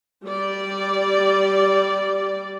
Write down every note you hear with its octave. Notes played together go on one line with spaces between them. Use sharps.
G3 D5